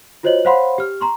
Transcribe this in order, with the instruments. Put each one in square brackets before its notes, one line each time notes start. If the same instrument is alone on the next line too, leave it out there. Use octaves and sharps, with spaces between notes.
[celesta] F4 F#4 C5 C#5 D#5 F#7
C5 C#5 F5 F#5 B5 C6
G4 F6
A#5 C6 C#6